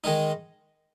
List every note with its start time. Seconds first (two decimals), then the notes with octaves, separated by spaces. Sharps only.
0.04 D#3 G#3 D#4